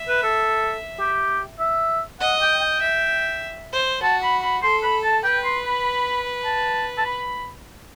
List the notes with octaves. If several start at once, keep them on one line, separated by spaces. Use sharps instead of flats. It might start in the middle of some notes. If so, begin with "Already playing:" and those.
Already playing: E5
B4
A4
G4
E5
D#5 F#5
G5
G5
E5
C5
F#4 A5
B5
B5
A4 C6
B5
A5
B4 G5
C6
B5
A5
A5
B5